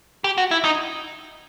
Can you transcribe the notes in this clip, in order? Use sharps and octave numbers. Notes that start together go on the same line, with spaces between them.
G4
F#4
E4
D#4